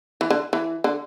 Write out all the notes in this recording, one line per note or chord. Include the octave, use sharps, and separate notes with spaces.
E3
D3
E3
D3